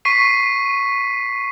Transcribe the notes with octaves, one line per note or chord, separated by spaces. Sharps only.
C#6 B6 C7 D#7